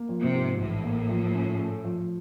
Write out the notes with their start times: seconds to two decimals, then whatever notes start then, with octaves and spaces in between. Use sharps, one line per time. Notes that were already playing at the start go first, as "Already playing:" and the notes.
Already playing: A#3
0.09 F3
0.22 C3
0.33 G#2
0.59 A1 A2
0.84 A#3
1.09 F3
1.35 C#4
1.59 A3
1.85 F3